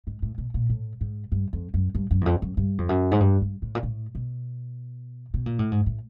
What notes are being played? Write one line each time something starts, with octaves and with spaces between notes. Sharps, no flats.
G#2
A2
B2
A#2
A2
G#2
G2
F2
F#2
G2
F#2
E2
F2
F#2
G2
F2
F#2
G#2
G2
G2
A2
A#2
A2
B2
B2
A#2
A2
G#2
A2